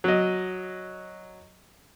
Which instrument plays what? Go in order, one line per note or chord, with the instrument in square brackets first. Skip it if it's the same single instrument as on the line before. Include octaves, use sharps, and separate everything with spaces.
[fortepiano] F#3 D#5